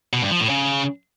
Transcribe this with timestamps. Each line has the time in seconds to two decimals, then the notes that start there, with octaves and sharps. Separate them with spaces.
0.13 B2
0.22 G2
0.31 F3
0.40 A2
0.49 C#3